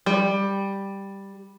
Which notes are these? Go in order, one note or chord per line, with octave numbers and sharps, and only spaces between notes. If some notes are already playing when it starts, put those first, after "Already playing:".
G3